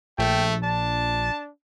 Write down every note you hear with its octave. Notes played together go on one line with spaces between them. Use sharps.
A#1 A3 G5
D4 A5